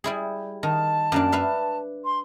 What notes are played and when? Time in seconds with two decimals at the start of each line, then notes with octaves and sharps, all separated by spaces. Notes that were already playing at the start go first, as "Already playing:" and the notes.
0.04 G3 E4 G#4
0.63 D#3 A5
1.12 F#2 A#3 D4
1.32 B4 E5 F5
2.05 C6